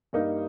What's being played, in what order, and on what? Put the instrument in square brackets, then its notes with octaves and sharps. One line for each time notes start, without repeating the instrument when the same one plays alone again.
[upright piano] G2 G3 A#3 D#4